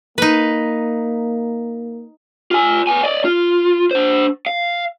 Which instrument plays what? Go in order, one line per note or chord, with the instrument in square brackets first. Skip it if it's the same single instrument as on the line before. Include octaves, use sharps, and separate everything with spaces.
[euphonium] A#3 [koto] D#4 B4
[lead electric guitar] F4 G#5
B3 G#5
D5 D#5
F4
D4 C5
F5